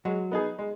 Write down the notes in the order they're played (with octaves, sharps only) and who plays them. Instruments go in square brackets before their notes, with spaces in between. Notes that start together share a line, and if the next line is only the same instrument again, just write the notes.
[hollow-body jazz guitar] F#3 F#4 [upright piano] G#3
[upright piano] B3 D#4 G#4
G#3